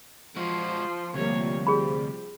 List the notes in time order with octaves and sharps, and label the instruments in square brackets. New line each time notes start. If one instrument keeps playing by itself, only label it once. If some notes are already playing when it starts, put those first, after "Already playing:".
[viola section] F3 C6 [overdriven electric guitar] G#3 F#4
[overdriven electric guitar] D2 [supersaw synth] C3 F3 G3 [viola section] A#3 C#5
[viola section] G4 [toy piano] G#4 B5